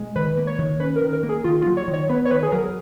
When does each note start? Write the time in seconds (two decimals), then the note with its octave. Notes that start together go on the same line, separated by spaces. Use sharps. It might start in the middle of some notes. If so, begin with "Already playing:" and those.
Already playing: B2 G#3
0.16 D#3 B4
0.37 A#3
0.47 C#5
0.58 D#3
0.80 C#4 B4
0.96 A#4
1.01 D#3
1.13 A#4
1.23 A#3
1.29 G#4
1.44 D#3 F4
1.61 F4
1.66 F#3
1.77 C#5
1.88 D#3
1.93 C#5
2.09 B3 B4
2.25 C#5
2.31 D#3 B4
2.43 G#4
2.52 F#3 A#4